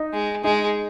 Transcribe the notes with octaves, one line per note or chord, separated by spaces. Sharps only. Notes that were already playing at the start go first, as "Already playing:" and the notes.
Already playing: D#4
G#3
G#3 D#4